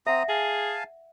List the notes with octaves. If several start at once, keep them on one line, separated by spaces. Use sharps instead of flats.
C4 E5 F#5 A#5 D#6
G#4 F5 G#5 A5